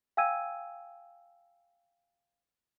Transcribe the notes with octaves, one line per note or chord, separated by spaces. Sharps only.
F5 G5 G#5 E6 G#6 D#7